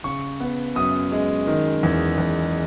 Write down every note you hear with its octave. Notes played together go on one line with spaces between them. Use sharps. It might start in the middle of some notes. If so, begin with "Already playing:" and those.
C#3 C#6
B3
F#2 D#6
G#3
D#3
E2
E2